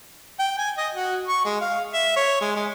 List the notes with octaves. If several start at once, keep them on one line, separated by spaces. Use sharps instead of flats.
G5
G#5
D#5
F#4
C#6
G#3
F5
E5
C#5
G#3
G#3